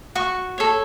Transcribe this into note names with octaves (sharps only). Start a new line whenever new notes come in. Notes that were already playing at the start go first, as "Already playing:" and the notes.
F#4 C#6
A4 C#5